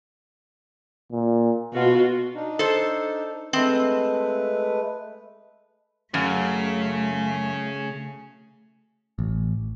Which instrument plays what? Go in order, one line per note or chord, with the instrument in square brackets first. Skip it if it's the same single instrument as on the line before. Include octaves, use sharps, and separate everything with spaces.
[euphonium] A#2
[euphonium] B2 [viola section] F4 F#4
[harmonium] D4 D#4
[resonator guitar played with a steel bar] A4 C5
[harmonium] G#3 A3 B4 [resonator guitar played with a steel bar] C4
[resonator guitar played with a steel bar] F#2 [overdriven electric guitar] C#3 [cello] A3
[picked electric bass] A1